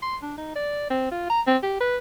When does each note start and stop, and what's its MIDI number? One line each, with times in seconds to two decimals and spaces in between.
0.02 0.17 84
0.22 0.37 62
0.38 0.54 63
0.56 0.85 74
0.90 1.09 60
1.11 1.26 65
1.30 1.41 82
1.47 1.57 60
1.63 1.77 67
1.80 1.97 71